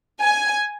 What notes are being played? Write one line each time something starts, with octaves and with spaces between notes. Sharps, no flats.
G#5